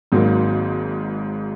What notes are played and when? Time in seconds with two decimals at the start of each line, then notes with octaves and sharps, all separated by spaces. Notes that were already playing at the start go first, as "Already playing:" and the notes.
0.12 G#1 G#2 F#3 A#3